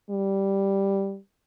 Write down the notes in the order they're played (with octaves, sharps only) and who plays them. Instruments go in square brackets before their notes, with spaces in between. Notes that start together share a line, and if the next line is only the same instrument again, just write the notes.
[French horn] G3